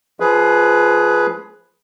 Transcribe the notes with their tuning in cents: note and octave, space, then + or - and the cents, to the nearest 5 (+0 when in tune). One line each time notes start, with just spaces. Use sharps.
F3 +0 G#4 +15 B4 +0